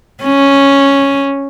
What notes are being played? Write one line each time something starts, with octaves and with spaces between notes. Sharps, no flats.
C#4